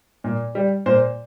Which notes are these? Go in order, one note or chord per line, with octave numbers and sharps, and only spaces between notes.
A#2
G3
A#2 C5